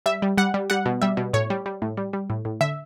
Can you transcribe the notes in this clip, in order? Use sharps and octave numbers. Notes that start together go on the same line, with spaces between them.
G3 E5
G3
G3 F#5
G3
G3 F#5
B2
G3 E5
B2
A2 C#5
G3
G3
A2
G3
G3
A2
A2
D3 E5